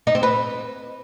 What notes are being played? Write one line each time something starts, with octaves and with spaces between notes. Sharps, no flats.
D#4
C4
B4